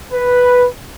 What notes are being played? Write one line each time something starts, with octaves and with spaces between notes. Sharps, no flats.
B4